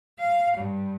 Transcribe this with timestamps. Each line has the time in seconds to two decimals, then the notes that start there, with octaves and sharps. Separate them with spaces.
0.18 F5
0.56 G2